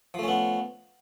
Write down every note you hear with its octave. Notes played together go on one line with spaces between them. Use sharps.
F3 A3 B3 C#4